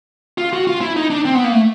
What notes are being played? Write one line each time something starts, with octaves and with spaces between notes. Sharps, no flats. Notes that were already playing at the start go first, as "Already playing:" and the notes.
F4
F#4
F4
E4
D#4
D4
C4
B3
A#3
A3